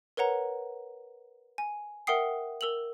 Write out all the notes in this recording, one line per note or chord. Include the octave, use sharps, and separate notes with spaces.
A#4 B4 C#5 F#5 A#5
G#5
A#4 E5 F#5 G5 D#6 C7
A#4 E6 F7 F#7